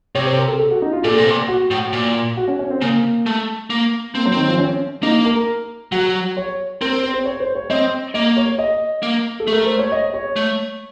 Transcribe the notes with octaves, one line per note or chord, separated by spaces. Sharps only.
C3 C#5
C5
A#4
A4
A4
F#4
D#4
F4
A#2 A4
C3
A#2
F#4
A2
A#2
F#4
C#4
C#4
C4
C#3 A#3
A3
A#3
A#3 C4
F#3
D#3 C4
F3
C#4
A#3 D#4
A#4
F#3 F#4
C#5
C4 A#4
C5
C5
C#5
C5
C#5
C4 D#5
A#3 D#5
C#5
D#5
A#3
A4
A3
A#4
C5
C#5
D#5
C#5
A3